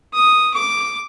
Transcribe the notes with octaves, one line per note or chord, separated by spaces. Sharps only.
D#6
D6